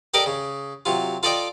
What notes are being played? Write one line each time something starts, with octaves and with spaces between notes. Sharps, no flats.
G4 A4 A#4 D5 D#5 G5
C#3
C3 F#3 F4
F4 A4 D5 D#5 G5 D6